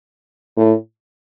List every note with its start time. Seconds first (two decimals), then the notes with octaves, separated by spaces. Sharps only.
0.57 A2